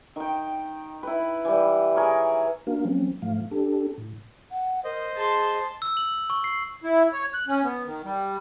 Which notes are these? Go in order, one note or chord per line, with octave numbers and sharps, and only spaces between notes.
D#3 G5
E4 B4
E3 G3
G#4 A#4 C#5
A#3 D4 F#4 A#4 F5
F3 F#3 A#3 C4 C#4
G#2 F3 A3 F5
D4 G4 A4
A2
F#5
A#4 C5 D#5
G#4 A5 C6
E6
F#7
C#6
C7
E4
C#5
F#6
C#4
B3
D#3
G3